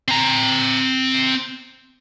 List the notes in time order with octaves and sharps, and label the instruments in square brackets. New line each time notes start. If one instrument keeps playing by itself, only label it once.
[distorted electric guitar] C4 A#5